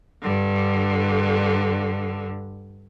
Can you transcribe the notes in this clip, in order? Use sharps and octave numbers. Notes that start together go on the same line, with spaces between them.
G2 D3